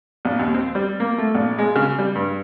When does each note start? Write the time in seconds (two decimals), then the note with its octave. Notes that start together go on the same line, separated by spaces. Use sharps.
0.25 A#1
0.39 D#2
0.54 C4
0.75 G3
1.00 A#3
1.18 A3
1.34 A#1
1.59 G#3
1.75 C#3
1.99 G3
2.15 G2